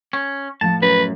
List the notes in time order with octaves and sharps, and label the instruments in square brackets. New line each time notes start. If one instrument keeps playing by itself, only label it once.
[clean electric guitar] C#4
[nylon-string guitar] A2 F3 F#5 [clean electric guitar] A5
[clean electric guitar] F#2 [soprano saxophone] B4